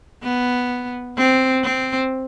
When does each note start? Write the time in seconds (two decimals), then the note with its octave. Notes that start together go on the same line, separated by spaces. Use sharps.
0.23 B3
1.17 C4
1.63 C4